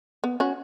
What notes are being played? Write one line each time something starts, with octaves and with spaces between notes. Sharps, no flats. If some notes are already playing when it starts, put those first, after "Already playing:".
B3
C#4 F#4